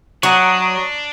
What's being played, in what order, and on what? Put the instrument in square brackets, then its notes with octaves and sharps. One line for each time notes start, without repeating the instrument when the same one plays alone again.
[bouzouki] F#3 [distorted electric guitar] D4 [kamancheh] A#5 D#6 [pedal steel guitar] C#6